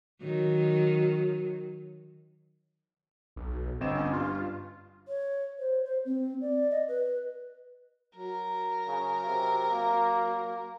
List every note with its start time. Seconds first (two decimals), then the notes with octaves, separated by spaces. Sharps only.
0.22 D#3 F#3
3.36 B1
3.81 G1 C4 D#5 E7
3.95 C#4
4.13 G2 F4
5.08 C#5
5.59 C5
5.84 C5
6.05 C4
6.41 D5
6.71 D#5
6.88 B4
8.16 F#3 A#4
8.87 C#3
9.26 C3
9.70 A#3